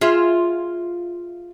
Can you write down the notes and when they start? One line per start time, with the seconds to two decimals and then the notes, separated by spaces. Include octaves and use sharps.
0.01 F4 G#4 E5